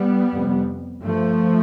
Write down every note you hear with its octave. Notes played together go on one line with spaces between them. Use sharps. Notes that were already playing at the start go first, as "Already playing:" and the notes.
Already playing: G3 B3
F2 C3
G2 F3 A3